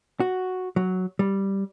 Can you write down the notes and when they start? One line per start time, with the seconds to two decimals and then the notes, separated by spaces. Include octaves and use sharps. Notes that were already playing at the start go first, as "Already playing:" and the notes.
0.20 F#4
0.76 F#3
1.19 G3